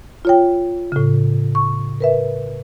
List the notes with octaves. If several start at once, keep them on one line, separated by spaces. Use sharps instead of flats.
F4 C#5 G5
A2 C#3
C#6
A#4 B4 E5